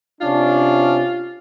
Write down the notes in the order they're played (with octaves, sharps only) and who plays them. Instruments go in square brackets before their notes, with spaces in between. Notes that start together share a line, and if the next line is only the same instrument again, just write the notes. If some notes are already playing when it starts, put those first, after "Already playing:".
[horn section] C3 C#4 D4 [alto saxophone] F4